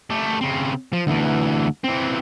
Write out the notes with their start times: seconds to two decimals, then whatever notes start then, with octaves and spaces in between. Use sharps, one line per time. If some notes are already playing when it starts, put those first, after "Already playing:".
0.10 A3 G4
0.41 C#3 C4
0.93 F3
1.07 D2 E3
1.84 E3 C4